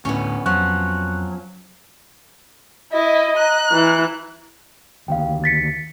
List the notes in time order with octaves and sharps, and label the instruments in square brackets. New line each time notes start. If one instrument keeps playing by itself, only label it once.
[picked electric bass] D2 A2 [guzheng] B3 C#4
[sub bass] F2 [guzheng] F3 [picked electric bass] F#3 [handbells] C#6 F#6
[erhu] E4 [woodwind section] D#5
[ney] A#5 [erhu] F#6
[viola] E3
[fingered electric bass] D2 D#3 [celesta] F5 G5
[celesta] A6 B6 C#7